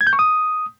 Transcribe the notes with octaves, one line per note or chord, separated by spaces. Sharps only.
G#6
G6
C#6
D#6